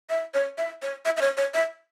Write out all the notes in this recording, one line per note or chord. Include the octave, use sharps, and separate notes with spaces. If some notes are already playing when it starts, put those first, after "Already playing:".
E5
C#5
E5
C#5
E5
E5
C#5
C#5
E5